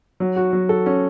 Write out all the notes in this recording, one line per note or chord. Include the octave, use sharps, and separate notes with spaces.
F#3
F#4
F#3
A4
C#4